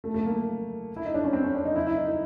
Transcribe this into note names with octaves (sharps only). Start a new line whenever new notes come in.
A3
A3
A#3
E4
D#4
D4
C#4
C4
C#4
D4
D#4
E4
E4
D#4
D#4